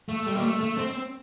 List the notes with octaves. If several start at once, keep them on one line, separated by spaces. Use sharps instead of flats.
A3
G3
A#3
A3
A3
C4